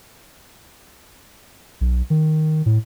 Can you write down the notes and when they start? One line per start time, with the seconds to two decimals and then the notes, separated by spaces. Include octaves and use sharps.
1.81 B1
2.10 D#3
2.66 A2